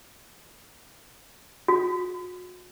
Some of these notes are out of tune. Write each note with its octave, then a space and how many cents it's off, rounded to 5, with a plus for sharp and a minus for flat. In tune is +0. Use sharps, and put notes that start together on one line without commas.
F#4 -40